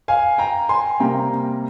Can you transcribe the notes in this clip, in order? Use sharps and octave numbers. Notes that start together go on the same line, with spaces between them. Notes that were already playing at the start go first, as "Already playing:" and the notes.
F5 G#5
G5 A#5
G#5 C6
C3 G3 A#3 G5 A#5